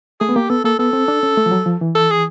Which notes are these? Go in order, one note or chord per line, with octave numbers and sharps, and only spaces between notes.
A3 G#4
B3
A#3 G4
B3 A4
A#3 A4
B3 A4
C4
D4
C#4
A3
F3
F#3
F3
E3
A4
G#4